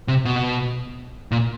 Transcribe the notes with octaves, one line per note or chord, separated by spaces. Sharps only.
C3
B2
A#2